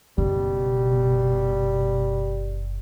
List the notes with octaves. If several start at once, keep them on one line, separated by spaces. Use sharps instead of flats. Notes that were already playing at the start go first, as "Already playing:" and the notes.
F#1 B2 G3